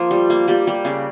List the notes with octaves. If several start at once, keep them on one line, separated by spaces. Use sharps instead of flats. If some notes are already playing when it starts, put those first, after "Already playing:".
Already playing: F3 A#3 F4
G3
A#3
G3 G4
G3
C#3